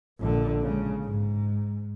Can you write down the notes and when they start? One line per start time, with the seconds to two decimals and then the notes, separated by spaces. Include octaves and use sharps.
0.20 A#1 D3
0.62 C#3 G#3
1.04 G#2